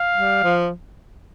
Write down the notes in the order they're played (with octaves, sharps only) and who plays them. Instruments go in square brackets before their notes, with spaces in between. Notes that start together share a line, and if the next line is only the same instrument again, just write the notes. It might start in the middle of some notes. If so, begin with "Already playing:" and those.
Already playing: [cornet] F5
[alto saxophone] G3
F3